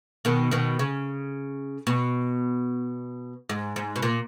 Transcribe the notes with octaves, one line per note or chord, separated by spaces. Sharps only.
B2 D#3
B2 D#3
C#3
B2
G#2
G#2
B2
A#2